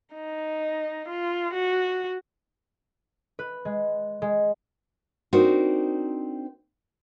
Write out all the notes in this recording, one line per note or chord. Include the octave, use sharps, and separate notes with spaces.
D#4
F4
F#4
B4
G#3
G#3
C4 D4 D#4 F#4 A#4 C5